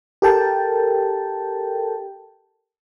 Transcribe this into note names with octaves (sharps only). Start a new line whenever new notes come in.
G4 A4 A#4 G5 A5